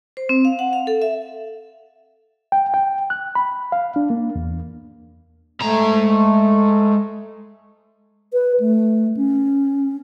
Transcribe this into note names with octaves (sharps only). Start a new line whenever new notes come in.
C5
C4
F5
F#5
F5
A4
E5
G5
G5
F#6
B5
F5
D4
A#3
E2
G#3 A3 A#5
B4
A3
C#4